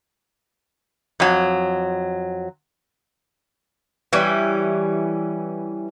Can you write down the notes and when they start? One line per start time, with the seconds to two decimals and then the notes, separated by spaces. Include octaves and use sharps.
1.20 F2 F#3
4.13 E3 G3 C#4